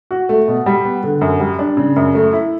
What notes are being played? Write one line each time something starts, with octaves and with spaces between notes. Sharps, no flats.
F#4
A3
B2
G3
B3
D3
F#2
G3
D4
C#3
F#2
A3
E4